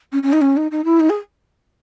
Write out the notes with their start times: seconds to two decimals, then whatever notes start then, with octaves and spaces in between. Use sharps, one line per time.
0.12 C#4
0.23 C#4
0.32 D#4
0.41 C#4
0.56 D#4
0.71 D#4
0.84 E4
1.00 D#4
1.09 G#4